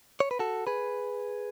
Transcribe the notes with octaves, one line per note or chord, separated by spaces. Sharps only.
C#5
B4
F#4 A4
G#4 B4